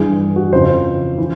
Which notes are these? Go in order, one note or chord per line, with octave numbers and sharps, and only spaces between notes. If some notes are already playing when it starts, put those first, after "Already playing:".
Already playing: G2 E3 G#4
F#4
F2 C#3 E3 C5
E3